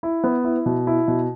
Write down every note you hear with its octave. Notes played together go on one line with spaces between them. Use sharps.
E4
B3
E4
B2
E4
B2